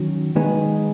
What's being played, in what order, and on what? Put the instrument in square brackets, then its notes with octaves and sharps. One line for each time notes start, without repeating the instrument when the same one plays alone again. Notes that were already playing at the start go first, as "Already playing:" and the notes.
Already playing: [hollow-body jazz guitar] D#3 F#3 C#4 F#4
D#3 G#3 B3 D#4 G#4